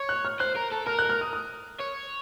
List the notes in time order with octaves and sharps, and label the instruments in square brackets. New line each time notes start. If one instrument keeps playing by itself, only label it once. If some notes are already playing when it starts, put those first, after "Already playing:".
Already playing: [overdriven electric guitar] C#5
[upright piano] F#6
F6
[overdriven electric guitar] C5 [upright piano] F#6
[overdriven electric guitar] A#4
A4
[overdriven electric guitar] A#4 [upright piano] F6
[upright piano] F#6
F6
D#6
D#6
[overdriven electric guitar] C#5